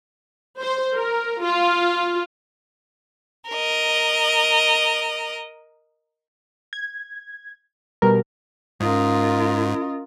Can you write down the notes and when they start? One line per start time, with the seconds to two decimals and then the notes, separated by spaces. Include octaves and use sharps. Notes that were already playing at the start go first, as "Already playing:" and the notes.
0.59 C5
0.95 A#4
1.42 F4
3.49 A#4 D#5
6.73 G#6
8.02 B2 G3 A#4
8.80 G#2 C#4 F4 A#4 D#5 D#6